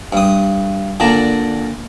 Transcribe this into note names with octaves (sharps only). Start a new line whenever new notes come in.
G2 D#6
A#2 D3 D4 A5 A#5